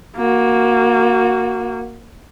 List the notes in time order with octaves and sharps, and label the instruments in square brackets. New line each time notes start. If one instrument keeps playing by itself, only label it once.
[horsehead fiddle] A#3 F#4